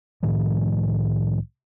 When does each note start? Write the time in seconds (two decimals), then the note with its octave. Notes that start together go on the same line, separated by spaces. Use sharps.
0.23 C2 A2 D#3 F3